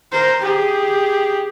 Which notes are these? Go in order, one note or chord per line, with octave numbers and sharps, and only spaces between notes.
A#4 C5
G4 G#4